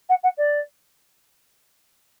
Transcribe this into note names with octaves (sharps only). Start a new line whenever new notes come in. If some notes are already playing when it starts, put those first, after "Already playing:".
F#5
F#5
D5